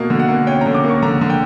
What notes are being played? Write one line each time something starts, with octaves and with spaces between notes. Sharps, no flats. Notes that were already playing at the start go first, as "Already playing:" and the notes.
Already playing: B2 A#3
D3
F#5
A#3
C#4 G5
A#5
D3
D6
A#3
C#6
D3 A#5
D3
G5